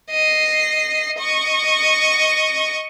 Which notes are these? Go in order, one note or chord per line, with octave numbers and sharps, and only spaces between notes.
D#5 C7
D#5 C#6